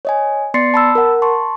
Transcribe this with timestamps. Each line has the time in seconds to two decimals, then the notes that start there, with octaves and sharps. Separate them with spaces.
0.05 C#5 D#5 G#5
0.54 B3 D5 C6 A6 C7 C#7
0.74 A5 B5 E6
0.95 A#4 F#5
1.22 A5 C6 C#6